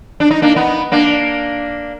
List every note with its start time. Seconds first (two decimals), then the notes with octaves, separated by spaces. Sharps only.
0.20 D4
0.31 D#4
0.42 A#3 D4
0.56 B3 D#4
0.92 A#3 D4